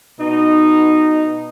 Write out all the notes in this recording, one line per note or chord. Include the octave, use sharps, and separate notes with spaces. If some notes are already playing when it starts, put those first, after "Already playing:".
B2 D#4